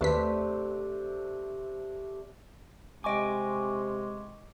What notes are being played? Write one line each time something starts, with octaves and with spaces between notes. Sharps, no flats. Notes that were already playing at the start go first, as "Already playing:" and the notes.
D#2 C3 A3 D4 B4 B6
C3 G#3 D#5 G5 G#5 C#6 D6